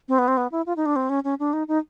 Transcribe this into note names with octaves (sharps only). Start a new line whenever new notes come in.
C4
B3
C4
B3
E4
F4
D#4
D4
C4
C#4
C#4
D4
D#4
D#4